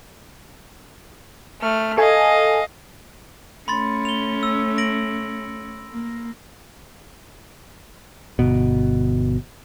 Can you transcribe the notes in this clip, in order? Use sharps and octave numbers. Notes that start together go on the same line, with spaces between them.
A3 F6
A4 D#5 F5 G#5
A3 C#4 B5 C6 A6
F7 G7
E6
A#6 D7 F#7
A#3
G1 B2